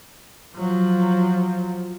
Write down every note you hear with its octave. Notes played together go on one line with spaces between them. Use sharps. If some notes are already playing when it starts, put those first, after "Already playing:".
F3 F#3